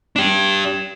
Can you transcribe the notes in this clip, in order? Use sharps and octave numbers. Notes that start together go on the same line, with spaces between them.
D4 G4